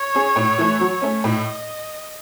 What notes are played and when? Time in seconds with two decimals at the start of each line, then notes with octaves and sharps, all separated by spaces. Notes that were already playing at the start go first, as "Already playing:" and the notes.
Already playing: C#5
0.15 C#4 G#4
0.36 A2
0.58 E3 A3
0.80 F#3
1.02 A3 C#4
1.24 A2 D#5